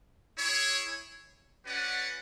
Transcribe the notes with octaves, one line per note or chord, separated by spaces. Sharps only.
E4 G#4 C#5
C#4 F#4 B4 D5 F#5